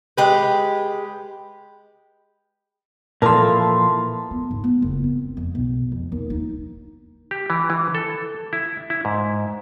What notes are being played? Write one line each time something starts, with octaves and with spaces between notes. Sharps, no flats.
G#3 G4 B4
A#2 E3 F3 A4 A#4 A5 C6
B3
G#2
B3
F#1
C4
F2
B1
F2
D#2
D#4
G4
E3
E3
A4
E4
E4
G#2